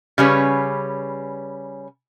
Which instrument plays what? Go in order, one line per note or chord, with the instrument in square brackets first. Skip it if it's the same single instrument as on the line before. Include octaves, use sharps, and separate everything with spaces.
[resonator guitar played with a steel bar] C#3 G3 C#4 B4